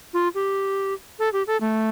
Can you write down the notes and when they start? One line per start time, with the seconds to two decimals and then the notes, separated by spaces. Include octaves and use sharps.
0.13 F4
0.35 G4
1.19 A4
1.33 G4
1.47 A4
1.61 A3